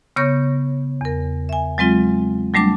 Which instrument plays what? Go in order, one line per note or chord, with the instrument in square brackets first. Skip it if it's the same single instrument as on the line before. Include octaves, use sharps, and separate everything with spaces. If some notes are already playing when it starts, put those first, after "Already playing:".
[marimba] C#3 B3 C#5 C#6 G6 A#6
E2 A#4
E5 G#5
F#3 G#3 C4 F4
F#3 G3 A3 D4 A5 D6